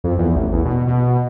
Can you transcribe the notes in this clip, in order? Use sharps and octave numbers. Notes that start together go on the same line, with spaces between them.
F2
E2
A1
E2
B2
B2